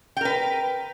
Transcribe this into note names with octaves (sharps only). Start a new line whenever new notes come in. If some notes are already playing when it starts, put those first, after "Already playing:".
A#4 B4 G5